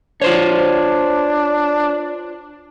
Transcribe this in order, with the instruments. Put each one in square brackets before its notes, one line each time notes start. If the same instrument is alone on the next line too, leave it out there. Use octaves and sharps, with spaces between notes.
[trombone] D4 [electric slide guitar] F4 C5 C#5